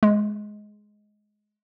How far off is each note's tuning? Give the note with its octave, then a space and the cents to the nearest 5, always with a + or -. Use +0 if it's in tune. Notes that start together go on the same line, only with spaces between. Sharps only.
G#3 +10